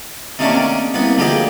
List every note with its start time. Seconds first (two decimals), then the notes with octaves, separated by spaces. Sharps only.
0.39 C3 D#3 A3 A#3 C#4 D4
0.94 C2 A#3 B3 B4
1.18 D2 F3 A#3 G4 G#4 D#5